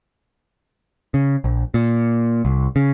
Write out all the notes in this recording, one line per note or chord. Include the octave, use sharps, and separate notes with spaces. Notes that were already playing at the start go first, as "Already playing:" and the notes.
C#3
A#1
A#2
C2
C#3